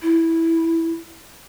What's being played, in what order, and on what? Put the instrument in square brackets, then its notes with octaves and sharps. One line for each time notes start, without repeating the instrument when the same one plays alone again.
[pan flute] E4